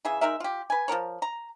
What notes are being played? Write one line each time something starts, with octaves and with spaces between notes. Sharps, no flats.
C#3 E3 G#4 E5
G#3 D#4 A#4 E5
F4 G4
B4 G#5
F3 C4 A#4 C#5
A#5